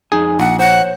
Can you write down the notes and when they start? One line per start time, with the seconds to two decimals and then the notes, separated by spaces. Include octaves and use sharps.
0.12 F2 D#4 G#4 G#5
0.40 A#1 F#5
0.59 C5 C#5 F#5